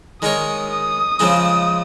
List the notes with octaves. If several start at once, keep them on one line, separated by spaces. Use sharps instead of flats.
D#3 G#3 D#4 A#4 C#5 D#6
D#6
C#3 F3 G#3 C4 D#4